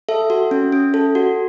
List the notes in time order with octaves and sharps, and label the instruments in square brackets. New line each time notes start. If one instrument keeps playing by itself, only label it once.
[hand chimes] A4 E5
F#4
C#4
C#4
A4
F#4